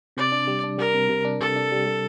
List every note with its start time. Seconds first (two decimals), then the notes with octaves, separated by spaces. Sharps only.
0.17 C3 D5
0.32 D4
0.47 G3
0.63 D4
0.78 G3 A#4
0.94 C3
1.09 C3
1.25 D4
1.40 C3 A4
1.56 D4
1.72 G3
1.86 G3